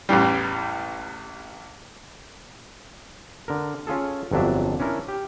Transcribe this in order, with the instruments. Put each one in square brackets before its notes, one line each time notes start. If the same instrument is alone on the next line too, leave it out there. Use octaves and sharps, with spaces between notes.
[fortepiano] A1 E2 A2 G3
[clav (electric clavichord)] D3 A#4
C#4 F4 G#4 A4
G1 F2 F#3 D4 E5
C#4 D4 E4 A#4
G4